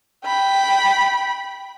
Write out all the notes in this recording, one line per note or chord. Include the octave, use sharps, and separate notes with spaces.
G5 B5